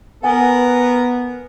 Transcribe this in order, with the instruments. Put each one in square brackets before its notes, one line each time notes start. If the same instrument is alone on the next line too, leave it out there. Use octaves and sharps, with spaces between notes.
[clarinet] B3 [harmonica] A#4 [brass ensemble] B4 [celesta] F#5 G#5